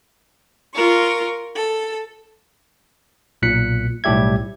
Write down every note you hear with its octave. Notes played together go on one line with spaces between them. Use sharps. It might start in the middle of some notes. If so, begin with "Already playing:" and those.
F4 A#4 C#6
A4
B1 A#2 F#6 B6 C#7
B1 A2 G3 G4 E5 G#6